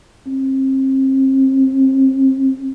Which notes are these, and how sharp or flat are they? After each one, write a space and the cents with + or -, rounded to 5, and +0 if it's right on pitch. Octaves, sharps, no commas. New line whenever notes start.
C4 +35